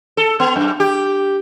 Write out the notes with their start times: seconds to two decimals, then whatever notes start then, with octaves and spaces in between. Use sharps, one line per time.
0.17 A4
0.40 B3
0.56 F#2
0.80 G4